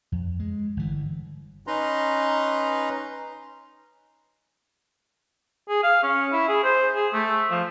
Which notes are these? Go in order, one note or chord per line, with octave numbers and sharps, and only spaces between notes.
F2
G#3
G1 E3
C#4 D#4 B4 A#5 C6
G#4
F5
C#4
E4
G#4
C5
G#4
A3
F3